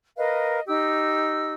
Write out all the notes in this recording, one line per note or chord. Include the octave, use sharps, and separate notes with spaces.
A#4 B4 D#5 F5
D#4 G4 E6